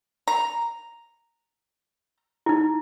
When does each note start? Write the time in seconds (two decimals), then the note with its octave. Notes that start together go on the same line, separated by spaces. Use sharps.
0.28 A#5
2.46 D#4 E4